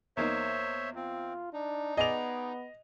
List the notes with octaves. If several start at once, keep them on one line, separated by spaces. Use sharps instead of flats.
E2 A#3 D#4 C5 C#5 E5
C4 F4
D4 D#4
B3 G#4 D5 D#5 F7